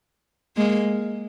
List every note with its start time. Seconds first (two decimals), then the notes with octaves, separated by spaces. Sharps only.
0.57 G#3 A#3